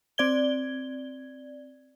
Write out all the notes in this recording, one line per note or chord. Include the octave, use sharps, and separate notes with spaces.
C4 D5 G#6 G7